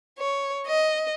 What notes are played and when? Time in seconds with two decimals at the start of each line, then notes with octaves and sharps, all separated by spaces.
0.19 C#5
0.67 D#5